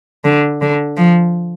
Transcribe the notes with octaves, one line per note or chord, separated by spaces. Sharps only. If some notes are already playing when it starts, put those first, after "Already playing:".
D3
D3
F3